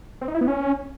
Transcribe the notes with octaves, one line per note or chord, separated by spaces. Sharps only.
C4
D#4
E4
B3
C#4